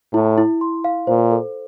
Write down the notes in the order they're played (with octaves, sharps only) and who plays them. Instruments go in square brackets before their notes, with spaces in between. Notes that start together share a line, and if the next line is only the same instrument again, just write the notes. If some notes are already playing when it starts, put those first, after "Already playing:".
[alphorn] A2 [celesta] E4
[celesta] E4
C6
F5
[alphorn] A#2 [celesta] C5
[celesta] A4